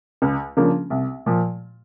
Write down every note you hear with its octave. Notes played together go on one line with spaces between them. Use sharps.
C#2
C#3 F3 A#3 D4
C2
A#2 F3